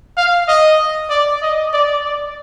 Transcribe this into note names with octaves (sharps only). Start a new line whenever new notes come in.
F5
D#5
D5
D#5
D5
D5